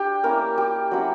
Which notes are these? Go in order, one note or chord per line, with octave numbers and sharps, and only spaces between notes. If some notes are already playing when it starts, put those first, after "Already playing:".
Already playing: D4 G4
A#3 C#4 E4 A#4
G4
F#3 C#4 E4